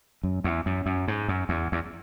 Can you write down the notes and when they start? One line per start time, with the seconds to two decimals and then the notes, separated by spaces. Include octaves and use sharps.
0.23 F#2
0.44 E2
0.66 F#2
0.86 F#2
1.08 G#2
1.28 F#2
1.49 E2
1.72 E2